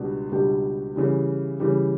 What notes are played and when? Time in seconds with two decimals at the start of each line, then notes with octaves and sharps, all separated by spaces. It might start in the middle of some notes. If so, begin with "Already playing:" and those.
Already playing: C#2 B2 G3 D4 G4
0.32 C#2 B2 G3 D4 G4
0.95 C#3 E3 G3
1.60 C#3 E3 G3